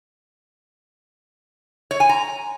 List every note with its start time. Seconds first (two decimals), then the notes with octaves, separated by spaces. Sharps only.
1.91 C#5
2.00 G#5
2.09 A#5